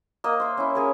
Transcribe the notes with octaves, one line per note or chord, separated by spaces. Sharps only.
A#3 D#5
C5 E5
C#4 E4
C#4 G#4 A#4